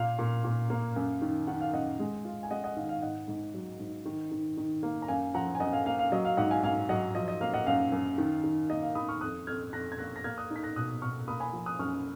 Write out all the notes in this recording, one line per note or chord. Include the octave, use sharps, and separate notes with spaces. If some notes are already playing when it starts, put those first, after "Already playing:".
Already playing: A#2 A#3 F5
A#2
A#2
A#3
F#2
D#3
D#3 F#5
F5
F#2 D#5 F#5
G#3
F4
G#5
G#3 D#5 F#5
D#5 F#5
D#3 F5
F5
G#2 D#5 F#5
G#2
F#3
G#2
D#3
D#3
D#3
A#3
A#5
F#2 F5 G#5
F3 F#5 A#5
G#5
F#2 D#5 F#5
F5 G#5
A#3 F5
F5
F#3 D#5
F5
G#2 D#5 F#5
F5 G#5
G#2 F5 G#5
F#3 D#5 F#5
F3 D#5
D#5
A#3 F5
D#5 F#5
F#2 F5
F#2
D#3
D#3
A#3 D#5
F5
D#3 B5 D#6
C#6 F6
F2 D#6 F#6
F2 F6 G#6
F2 F#6 A#6
G#6
A#3 F#6 A#6
A#6
A#3 F6 G#6
D#6 F#6
D#4
B6
F#6 A#6
B2 D#6 F#6
B2 C#6 F6
A#3 B5 D#6
G#5 B5
F3
D#6 F#6
F#2 C#6 F6